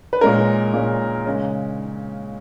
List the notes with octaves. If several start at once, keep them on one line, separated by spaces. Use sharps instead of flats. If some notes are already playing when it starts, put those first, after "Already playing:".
B4
A#2 G#3 C#4 A#4
A#2 G#3 C#4
C#3 G#3 C#4